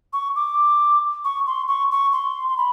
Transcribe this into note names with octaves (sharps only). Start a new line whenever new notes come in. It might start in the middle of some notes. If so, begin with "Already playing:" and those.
C#6
D6
C#6
C6
C#6
C#6
C6
C6
B5